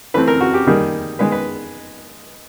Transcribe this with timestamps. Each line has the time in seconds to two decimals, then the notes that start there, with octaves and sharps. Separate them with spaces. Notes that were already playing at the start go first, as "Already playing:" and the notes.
0.14 E3 A3 C4 B4
0.27 A#4
0.40 F#4
0.54 G4
0.67 D#3 G3 A#3 G#4
1.19 D#3 G#3 B3 B4
1.32 B4